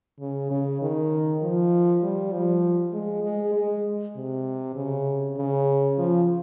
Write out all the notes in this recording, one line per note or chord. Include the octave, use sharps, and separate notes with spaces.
C#3
C#3
D#3
F3
G3
F3
G#3
G#3
G#3
C3
C#3
C#3
F3